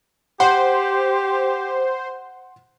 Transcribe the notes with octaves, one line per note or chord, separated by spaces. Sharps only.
G4 C5 F#5 C6